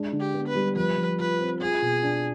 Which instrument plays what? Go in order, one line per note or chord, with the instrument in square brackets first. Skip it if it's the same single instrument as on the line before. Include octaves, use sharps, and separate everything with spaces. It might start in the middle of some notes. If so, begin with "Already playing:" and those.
Already playing: [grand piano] G#3 D4
D3
[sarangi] G4
[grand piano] B3
[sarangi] B4
[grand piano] G3
[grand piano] F3 [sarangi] B4
[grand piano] F3
[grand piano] F4 [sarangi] B4
[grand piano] C4
[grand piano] F4 [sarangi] G#4
[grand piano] B2
D4